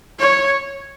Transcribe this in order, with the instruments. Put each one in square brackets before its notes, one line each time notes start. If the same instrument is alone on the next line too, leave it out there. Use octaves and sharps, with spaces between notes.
[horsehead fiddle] C#5